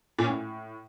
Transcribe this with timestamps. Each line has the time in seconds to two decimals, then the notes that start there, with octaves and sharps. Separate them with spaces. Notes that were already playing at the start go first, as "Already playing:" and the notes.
0.19 A#2
0.24 C#4
0.29 A2